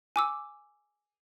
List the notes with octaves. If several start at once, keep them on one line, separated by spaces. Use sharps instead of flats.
G#5 D6 E6